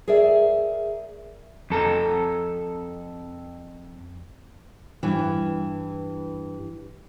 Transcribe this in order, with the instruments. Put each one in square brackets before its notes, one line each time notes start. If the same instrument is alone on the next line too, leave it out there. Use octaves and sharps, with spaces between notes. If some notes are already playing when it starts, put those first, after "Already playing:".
[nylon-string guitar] G#4 A#4 D5 E5
[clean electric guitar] F2 A4 A#5
[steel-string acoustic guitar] G2 E3